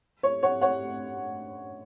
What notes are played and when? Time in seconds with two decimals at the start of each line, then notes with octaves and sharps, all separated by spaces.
0.23 C#5
0.43 C#5 F#5
0.61 C#5 F#5